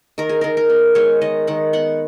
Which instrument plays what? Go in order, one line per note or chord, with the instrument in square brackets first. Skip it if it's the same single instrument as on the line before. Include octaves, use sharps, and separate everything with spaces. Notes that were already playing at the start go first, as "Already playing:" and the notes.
[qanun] D#3 A#4
G#4
D#3 A#4
A#4
B3
G#3 C#5
D#3 D#5
D#3 F#5
B3 F#5